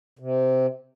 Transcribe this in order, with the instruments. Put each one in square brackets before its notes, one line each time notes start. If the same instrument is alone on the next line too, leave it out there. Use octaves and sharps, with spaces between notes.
[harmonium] C3